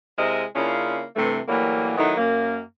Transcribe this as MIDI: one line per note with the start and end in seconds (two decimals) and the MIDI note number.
0.18 0.44 48
0.18 0.44 56
0.18 0.44 64
0.18 0.44 70
0.18 0.44 75
0.56 1.04 49
0.56 1.04 58
0.56 1.04 61
0.56 1.04 62
0.56 1.04 64
0.56 1.04 65
1.16 1.40 43
1.16 1.40 48
1.16 1.40 52
1.16 1.40 57
1.49 1.94 45
1.49 1.94 52
1.49 1.94 54
1.49 1.94 55
1.49 1.94 58
1.98 2.15 51
1.98 2.15 54
1.98 2.15 57
1.98 2.15 59
1.98 2.15 63
1.98 2.15 64
2.17 2.61 42
2.17 2.61 58